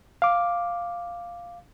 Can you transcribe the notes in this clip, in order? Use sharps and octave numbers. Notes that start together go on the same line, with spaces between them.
F5 D6